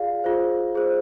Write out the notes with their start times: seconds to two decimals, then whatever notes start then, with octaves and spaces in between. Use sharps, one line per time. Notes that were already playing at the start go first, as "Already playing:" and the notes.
Already playing: F4 G#4 D5 F5
0.24 F4 G#4 C5
0.74 F4 G#4 C5